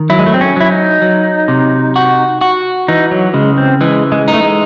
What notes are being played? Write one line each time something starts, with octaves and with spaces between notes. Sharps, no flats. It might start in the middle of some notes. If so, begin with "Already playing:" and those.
Already playing: D#3
F#3 E4
G#3
A3
C4
C#4
F#3 E4
D#4
F#3
C3
F#4
F#4
E3 D#4
F#3
C#3 G#3
C4
E3 G#3
G#3
D#4
A3
G#3